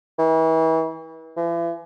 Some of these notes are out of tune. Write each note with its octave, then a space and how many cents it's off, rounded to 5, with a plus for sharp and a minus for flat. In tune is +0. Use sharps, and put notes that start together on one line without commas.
E3 -35
E3 +40